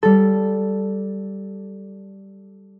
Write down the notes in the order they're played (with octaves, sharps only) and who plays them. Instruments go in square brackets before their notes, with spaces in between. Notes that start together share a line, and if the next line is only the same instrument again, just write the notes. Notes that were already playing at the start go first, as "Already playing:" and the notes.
[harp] G3 A4